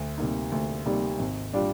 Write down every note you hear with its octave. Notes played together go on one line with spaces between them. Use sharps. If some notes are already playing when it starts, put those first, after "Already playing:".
Already playing: D2
C3 G3 A#3 D#4
D2
C3 G3 A#3 D#4
G#1
G3 D4 F4